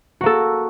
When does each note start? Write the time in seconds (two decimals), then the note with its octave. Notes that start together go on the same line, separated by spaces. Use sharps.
0.21 F#4
0.23 A#3
0.26 A4